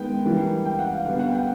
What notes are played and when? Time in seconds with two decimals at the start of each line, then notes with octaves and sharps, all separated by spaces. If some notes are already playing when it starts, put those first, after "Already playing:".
Already playing: D#3 G#3 B3 G5
0.25 E3 G3 A#3
0.65 G5
0.79 F#5
0.92 F5
1.05 D3 F5
1.09 G3 B3
1.20 F#5
1.32 G5